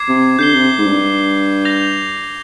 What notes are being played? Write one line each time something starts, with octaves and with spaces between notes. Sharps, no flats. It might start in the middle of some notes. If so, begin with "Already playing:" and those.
Already playing: D6 G#6 C7
C3
D3 G6 C7 G7
C3
G#2
G2
G6 A#6 F7